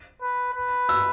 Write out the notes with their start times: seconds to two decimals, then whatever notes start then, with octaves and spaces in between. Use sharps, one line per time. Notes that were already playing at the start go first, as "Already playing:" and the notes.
0.21 B4
0.54 B4
0.89 E6